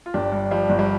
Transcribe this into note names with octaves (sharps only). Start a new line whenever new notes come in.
F4
G1 D4 G4
G2
F3 G3
G1
G3